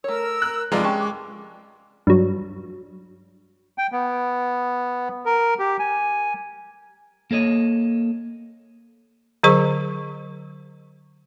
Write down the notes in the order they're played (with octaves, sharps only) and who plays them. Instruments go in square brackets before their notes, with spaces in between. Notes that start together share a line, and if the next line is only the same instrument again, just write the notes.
[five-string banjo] A3 C#5 [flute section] A#4 E6
[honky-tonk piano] F#6
[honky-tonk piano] F1 F4 D5 [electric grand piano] G#3 [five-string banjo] B4 A#5
[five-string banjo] C#4 G4 A5 [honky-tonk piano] C#6
[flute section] D6
[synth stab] G2 F#3
[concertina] G5
B3
A#4
G4
G#5
[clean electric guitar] A#3 A4 C#5 D#5
[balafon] D3 F#3 G#4 C5 C#6